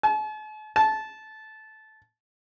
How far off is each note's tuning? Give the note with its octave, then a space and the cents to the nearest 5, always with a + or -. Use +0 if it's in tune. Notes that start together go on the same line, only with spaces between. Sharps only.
A5 -45
A5 -15